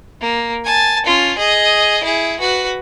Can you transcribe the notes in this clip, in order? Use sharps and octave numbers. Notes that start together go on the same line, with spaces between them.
A#3
G#5 A5
C#4 F4
G#4 D#5
E4 G#4
F#4 B4